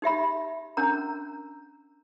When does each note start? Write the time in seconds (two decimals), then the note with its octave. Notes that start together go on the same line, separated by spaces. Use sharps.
0.02 D#4 G4 E5 B5
0.77 C#4 D4 A#4 A#5